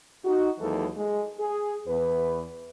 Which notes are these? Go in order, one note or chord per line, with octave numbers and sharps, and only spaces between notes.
D#4 F#4
D#2 E3 F#3 G#3 D#4 A4
G#3
G#4
E2 B4